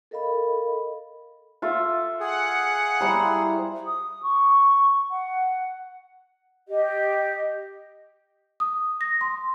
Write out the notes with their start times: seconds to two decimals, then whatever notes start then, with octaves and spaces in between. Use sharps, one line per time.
0.11 A4 A#4 D#5 F5 B5
1.62 F4 A4 E5
2.20 G#4 F#5
3.01 G3 E4 C5 A#5
3.86 D#6
4.23 C#6
5.11 F#5
6.68 G4 D#5
8.60 D#6
9.01 A#6
9.21 C6